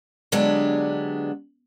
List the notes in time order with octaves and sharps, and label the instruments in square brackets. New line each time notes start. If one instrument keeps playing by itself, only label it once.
[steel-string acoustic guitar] D3 F#3 G#3 B3 D4 G4